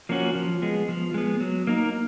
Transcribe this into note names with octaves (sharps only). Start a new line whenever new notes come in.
F3 A#3 C#4 F#4
F3
G#3 B3
F3
G#3 B3
F#3
A#3 D#4 A#4